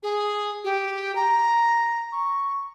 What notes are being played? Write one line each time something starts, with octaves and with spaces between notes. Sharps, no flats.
G#4
G4
A#5
C#6